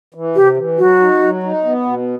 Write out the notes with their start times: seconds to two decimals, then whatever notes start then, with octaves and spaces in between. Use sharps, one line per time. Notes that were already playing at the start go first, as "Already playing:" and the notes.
0.14 E3
0.35 C3 G4
0.57 E3
0.79 F#3 F#4
1.00 D#4
1.22 F#3
1.43 D#4
1.65 B3
1.86 B2